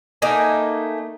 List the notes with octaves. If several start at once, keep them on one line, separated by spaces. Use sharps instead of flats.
A3 A#3 D#4 G#5